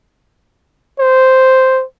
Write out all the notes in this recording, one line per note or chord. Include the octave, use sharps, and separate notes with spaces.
C5